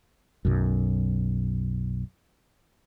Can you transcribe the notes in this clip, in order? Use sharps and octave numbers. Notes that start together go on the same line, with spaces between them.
B1 F#2